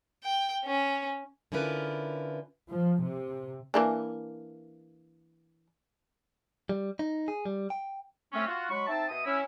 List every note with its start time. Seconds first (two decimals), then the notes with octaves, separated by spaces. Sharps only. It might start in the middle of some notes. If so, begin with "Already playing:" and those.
0.24 G5
0.64 C#4
1.52 D3 C#4 E4 F4 A#4 B4
2.71 F3
3.03 C3
3.74 E3 A#3 D4
6.69 G3
6.99 D#4
7.28 G#4
7.45 G3
7.70 G5
8.32 A3 C4 C#4
8.46 F4 F#4
8.69 F#3 G#3 B5 C#6
8.87 C4 D#4 E5 A5
9.09 B2 D#5 E5 D#6
9.25 C#4 E4